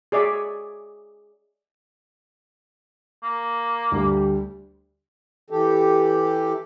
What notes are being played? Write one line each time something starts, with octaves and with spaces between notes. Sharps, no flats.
G#4 C#5 D5 E5
A#3
D2 G3
E3 G4 A4